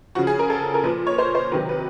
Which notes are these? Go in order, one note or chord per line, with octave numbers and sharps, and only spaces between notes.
C#3 F3 F#4
G#4
A#4
A4
A#4
A#2 F3 B4
C#5
C5
C5
C3 D#3 F#3 B4
B4